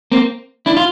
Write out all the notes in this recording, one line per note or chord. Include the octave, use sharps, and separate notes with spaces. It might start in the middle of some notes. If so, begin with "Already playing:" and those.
A#3 C4
D4 E4
F4